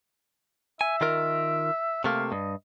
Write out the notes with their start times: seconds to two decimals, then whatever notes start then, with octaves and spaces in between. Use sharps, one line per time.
0.81 E5 G#5
1.01 D#3 F4 A#4
2.04 C3 A3 A#3 F5
2.32 G2 D#5